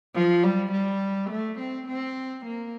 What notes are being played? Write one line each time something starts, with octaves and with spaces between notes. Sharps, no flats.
F3
G3
G3
A3
C4
C4
A#3